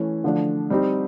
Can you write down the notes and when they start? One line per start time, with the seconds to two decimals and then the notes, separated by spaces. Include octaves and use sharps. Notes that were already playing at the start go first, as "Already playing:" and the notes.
Already playing: E3 A3 C#4
0.24 D3 F3 A3 D4
0.70 G3 C4 D#4 G4